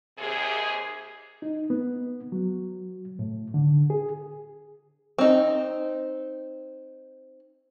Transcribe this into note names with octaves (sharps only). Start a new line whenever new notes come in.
D#2 C3 G#4
D#4
B3
F#3
A2
D3
G#4
C4 D#4